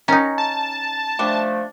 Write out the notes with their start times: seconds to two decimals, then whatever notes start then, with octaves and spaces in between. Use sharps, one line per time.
0.08 D#3 C#4 D#4 A#5
0.38 A5
1.19 F3 G3 A3 D4